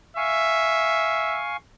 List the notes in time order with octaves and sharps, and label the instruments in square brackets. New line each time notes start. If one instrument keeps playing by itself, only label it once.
[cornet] E5 [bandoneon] F5 G#5 C#6